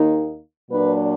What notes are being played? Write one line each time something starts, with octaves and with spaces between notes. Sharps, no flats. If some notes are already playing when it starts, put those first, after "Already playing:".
Already playing: D#2 D#3 A#3 D#4
A#2 F#3 D4 B4